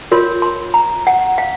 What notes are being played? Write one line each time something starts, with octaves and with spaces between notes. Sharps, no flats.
F4 A#4 C#5 C6
C6
A#5
F#5
F5